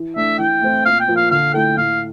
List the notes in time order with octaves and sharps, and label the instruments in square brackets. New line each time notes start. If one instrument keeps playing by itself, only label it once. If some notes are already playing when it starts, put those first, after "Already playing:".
Already playing: [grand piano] E3
[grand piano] A3 D4 [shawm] E5
[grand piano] E3 [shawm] G5
[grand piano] A3 C4 E4
[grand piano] A#2 [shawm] F5
[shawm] G5
[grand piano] F3 A#3
[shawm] F5
[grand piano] D3 [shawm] F5
[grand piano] A3 E4 A4 [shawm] G5
[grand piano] A2 [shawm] F5